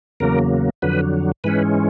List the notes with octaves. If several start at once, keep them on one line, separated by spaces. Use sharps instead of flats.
E2 C#3 F#3 A#3 A#4
F2 D3 F#3 B4
G#2 E3 G#3 C#4 B4